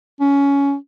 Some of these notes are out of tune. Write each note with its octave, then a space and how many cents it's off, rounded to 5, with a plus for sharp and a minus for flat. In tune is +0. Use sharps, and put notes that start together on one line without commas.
C#4 +15